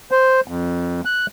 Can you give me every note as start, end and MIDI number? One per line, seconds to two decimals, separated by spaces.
0.11 0.40 72
0.48 1.01 41
1.05 1.26 90